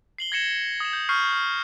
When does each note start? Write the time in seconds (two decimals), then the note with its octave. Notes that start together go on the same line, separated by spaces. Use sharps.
0.18 C7 F#7 G7
0.32 G#6 A#6 C#7 E7
0.80 D#6 E7
0.93 G6
1.09 C#6 D#6 F6 G6 C7
1.32 F6